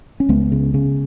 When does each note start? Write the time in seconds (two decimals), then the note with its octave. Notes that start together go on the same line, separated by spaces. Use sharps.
0.20 C#4
0.29 C#2 G#3 B3
0.52 C#3
0.74 C#3